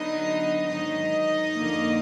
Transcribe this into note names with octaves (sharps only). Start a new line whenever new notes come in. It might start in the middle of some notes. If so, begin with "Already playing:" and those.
Already playing: D3 F#3 B3 D#4 D#5
G#2 D#3 F#3 D#4 D#5
F2 D3 F3 A#3